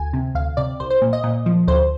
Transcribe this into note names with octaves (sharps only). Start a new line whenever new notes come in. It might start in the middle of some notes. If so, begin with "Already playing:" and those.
Already playing: D2 G#5
C3
D2 F5
C3 D5
C2 C5
C5
A#2
D#5
A#2
F3
D2 C5